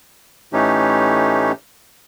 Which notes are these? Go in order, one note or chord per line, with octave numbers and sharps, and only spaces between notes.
A2 E3 A3 C#4 D#4 G4